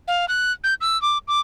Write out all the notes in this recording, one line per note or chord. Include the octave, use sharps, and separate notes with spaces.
F5
F#6
G6
E6
D6
D6